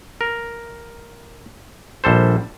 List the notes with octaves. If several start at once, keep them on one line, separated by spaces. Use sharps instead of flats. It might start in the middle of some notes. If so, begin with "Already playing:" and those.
A#4
A#1 G3 A4 C5